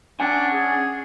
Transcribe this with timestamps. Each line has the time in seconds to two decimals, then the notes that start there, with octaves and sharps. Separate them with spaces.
0.20 C#4 D4 F#5 G#5
0.53 G#4